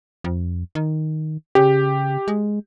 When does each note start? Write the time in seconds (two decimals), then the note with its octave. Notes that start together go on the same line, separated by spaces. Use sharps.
0.24 F2
0.75 D#3
1.55 C#3 G4
2.28 G#3